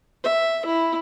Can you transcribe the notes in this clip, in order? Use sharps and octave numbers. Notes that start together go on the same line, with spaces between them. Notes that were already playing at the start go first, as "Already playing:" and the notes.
E5
E4